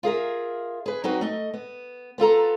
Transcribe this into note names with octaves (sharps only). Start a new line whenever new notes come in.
F4 G#4 A#4 E5
G#4 B4
F#3 C4 D#4 F#4 B4
A3 D#5
B3
B3 F4 A4 A#5